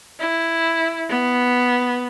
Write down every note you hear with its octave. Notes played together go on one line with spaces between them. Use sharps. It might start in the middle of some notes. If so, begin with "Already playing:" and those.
E4
B3